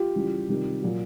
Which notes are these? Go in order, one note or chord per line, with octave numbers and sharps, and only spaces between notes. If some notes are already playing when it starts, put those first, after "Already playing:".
Already playing: F4 G4
C#3 E3 G3
C3 D#3 G3
A#2 F#3